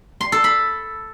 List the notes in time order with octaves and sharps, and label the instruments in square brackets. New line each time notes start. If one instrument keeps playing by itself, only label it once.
[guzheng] C6
A4
B5